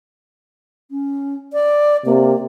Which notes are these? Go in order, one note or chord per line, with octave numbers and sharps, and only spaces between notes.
C#4
D5
C3 A#3